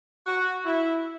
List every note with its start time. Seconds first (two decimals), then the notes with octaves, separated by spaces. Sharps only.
0.27 F#4
0.65 E4